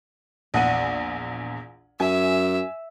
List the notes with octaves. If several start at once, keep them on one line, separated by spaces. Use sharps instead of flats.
A#1 E2 D5 F#5 D#7
F#2 E5 G#5